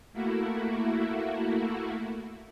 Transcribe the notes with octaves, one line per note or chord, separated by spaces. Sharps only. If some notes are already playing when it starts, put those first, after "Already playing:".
A3 A#3 E4 F#4